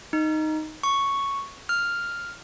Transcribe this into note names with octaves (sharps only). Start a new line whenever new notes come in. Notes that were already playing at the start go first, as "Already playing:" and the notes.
D#4
C#6
F6